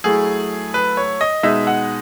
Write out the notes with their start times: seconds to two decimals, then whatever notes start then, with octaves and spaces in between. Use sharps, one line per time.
0.04 F#3 A3 E4 G#4
0.74 B4
0.97 C#5
1.21 D#5
1.43 B2 G#3 D#4 E5
1.67 F#5